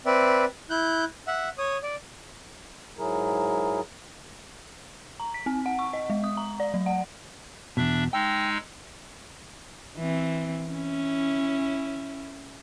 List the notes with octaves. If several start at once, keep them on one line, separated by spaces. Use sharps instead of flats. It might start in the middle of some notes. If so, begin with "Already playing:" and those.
C4 B4 D5 E5
E4 F#6 G6
E5 F#5
C#5 D#6
D5
G#2 F#3 E4 G#4 A#4
A#5
B6
C4
F#5
C#6
D#5
G#3
D#6
A#5
D5
F#3
F#5
E2 G#2 B2 D4 E5
G#3 D#4 G5 E6
E3 C4
C#4 E4